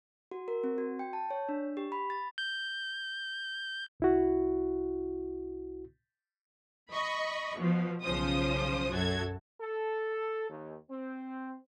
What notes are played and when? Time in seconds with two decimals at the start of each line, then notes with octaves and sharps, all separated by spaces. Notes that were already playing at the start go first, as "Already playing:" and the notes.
0.31 F#4
0.48 A#4
0.64 C4
0.78 F#4
0.99 G5
1.13 A5
1.30 C#5
1.49 D4
1.77 G4
1.92 B5
2.10 A6
2.38 G6
4.00 C2 E4 F#4
6.92 D#5 B5 C#6
7.57 B2 F3
8.03 B1 C#3 F3 C5 D#6
8.92 F#2 F#4 A4 G#6
9.60 A4
10.49 D#2
10.89 C4